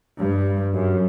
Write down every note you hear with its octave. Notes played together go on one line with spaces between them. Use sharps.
G2
F#2